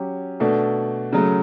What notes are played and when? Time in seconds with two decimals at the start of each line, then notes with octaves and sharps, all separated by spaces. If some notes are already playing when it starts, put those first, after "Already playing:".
Already playing: F#3 C#4 G4
0.40 B2 A3 D4 A4
1.13 C#3 F#3 A3